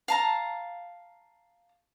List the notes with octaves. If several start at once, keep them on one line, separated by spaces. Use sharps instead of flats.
F5 A5 A#5